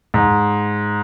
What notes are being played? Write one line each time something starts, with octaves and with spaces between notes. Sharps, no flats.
G#2